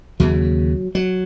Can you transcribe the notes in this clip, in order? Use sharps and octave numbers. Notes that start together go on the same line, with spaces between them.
D#2 C#3 F#3
F#3